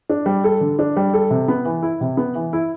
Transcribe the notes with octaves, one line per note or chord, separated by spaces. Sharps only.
D4
G3
A4
D3
D4
G3
A4
C3
B3
E3
E4
C3
B3
E3
E4